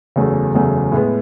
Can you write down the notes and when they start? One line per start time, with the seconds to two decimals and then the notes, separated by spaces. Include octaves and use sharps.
0.16 F#1 E2 C#3 F#3 A3
0.54 F#1 E2 C#3 F#3 A3
0.92 A2 G#3 B3